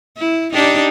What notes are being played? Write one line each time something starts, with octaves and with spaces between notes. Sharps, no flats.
E4
D4 D#4 G4